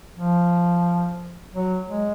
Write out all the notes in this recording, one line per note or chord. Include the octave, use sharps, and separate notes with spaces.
F3
F#3
G#3